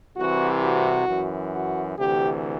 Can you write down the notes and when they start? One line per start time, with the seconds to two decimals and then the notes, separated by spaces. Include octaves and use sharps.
0.17 C2 C3 E3 F#4
0.62 F#4
1.08 F#2 E3
1.53 F#4
1.98 D2 C3 E3 G4